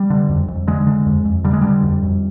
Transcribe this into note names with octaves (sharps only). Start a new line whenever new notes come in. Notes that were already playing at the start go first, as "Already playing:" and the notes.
Already playing: G3
D3
F2
F2
D3 G#3
D3
F2
F2
D3 G3
G#3
D3 G3
F2
F2